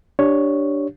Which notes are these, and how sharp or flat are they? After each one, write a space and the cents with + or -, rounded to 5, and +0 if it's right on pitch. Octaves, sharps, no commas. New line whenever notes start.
D4 +0 G4 -5 C#5 +0